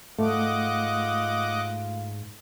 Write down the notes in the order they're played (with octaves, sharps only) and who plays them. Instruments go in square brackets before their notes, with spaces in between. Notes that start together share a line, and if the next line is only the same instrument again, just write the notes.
[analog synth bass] G#2 [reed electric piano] A3 [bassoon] F4 [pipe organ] D#5 F#5 D6